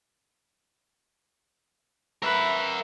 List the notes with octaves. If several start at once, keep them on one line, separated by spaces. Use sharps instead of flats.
A#4 B4 E5